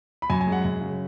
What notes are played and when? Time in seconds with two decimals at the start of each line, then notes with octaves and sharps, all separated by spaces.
0.22 B5
0.30 F#2 G#5
0.41 G#5
0.47 G#3
0.52 F#5
0.65 F#2
0.81 C#3